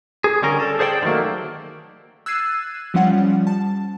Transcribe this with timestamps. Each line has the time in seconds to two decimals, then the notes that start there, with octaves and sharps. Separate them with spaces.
0.24 G#4
0.42 D3 G3 C#4 A#4
0.60 A4
0.79 G#4 C5 D5 F#5 G5
1.02 D3 D#3 F#3 A3 A#3
2.26 E6 F#6 G#6 A6 C7 D#7
2.94 F3 G3 C#4 F#5
3.47 A5